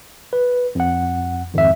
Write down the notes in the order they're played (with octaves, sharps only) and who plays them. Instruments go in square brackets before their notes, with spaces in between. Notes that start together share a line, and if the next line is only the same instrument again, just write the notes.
[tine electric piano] B4
F2 F#5
G#1 F2 E5